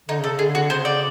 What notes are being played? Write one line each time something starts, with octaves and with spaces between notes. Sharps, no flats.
D3 D#4
C#3
A4
C#3
D3 G#4
F#4
C#3 C5
D5